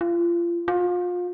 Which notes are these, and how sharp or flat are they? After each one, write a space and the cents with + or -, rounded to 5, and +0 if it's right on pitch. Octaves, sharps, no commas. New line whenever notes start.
F4 -30
F4 +30